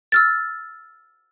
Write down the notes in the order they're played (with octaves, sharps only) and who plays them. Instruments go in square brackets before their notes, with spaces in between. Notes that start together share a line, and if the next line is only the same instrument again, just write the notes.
[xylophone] E6 F6 A6